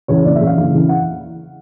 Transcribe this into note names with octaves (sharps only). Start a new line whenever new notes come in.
E2 C#3 E3 C#5
F#1 D5
E5
E2 C#3 E3
F5
F#1
E2 C#3 E3
F#5